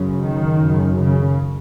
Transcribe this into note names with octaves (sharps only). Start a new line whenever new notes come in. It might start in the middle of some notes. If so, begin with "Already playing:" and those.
Already playing: F#2 C#3
D#3
F#2 C#3
C#3